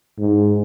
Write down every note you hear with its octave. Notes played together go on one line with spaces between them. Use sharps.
G#2